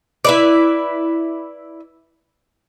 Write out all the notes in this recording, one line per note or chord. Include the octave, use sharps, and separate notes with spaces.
E4 B4 D5